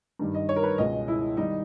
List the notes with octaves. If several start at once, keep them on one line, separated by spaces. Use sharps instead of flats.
G2 D#3 G3
D#5
C#5
A#4
B4
C#2 B2 G#3 D#5
E4
D#3 G3 D#4